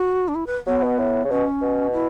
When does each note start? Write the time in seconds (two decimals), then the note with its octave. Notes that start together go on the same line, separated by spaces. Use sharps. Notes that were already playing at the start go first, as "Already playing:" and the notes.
Already playing: F#4
0.28 D4
0.35 E4
0.47 B4
0.66 F#3 B3
0.83 B2
0.99 A2
1.24 C#3
1.30 B2 C#4
1.61 B2
1.93 E4